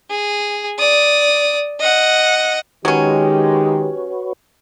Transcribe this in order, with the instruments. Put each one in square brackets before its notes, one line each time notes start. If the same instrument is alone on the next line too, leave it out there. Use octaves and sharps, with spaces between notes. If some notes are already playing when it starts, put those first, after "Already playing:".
[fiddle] G#4
D5 D#6
D#5 F#5
[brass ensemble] D#3 G#3 [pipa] F#3 C#4 [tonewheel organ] F#4 B4 C#5 [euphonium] G4